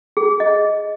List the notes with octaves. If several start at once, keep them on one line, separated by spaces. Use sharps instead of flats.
G#4
D#5